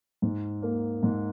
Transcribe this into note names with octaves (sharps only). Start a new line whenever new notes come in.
G#2
A#3
G#2